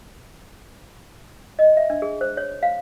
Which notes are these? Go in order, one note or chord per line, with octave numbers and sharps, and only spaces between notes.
D#5
E5
D4
G#4
C5
C#5
F5